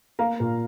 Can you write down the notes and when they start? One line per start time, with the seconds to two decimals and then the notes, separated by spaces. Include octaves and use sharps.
0.19 A#3 F5 A#5
0.40 A#2